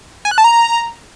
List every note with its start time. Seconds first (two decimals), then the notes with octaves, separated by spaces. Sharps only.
0.25 G#5
0.31 F#6
0.38 A5
0.44 A#5